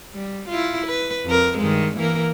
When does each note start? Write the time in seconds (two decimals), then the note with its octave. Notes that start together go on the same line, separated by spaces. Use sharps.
0.14 G3
0.49 E4 F4
0.86 B4
1.26 F2 A#4
1.58 G2 D#3 G#3
1.97 E3 A#3 A#4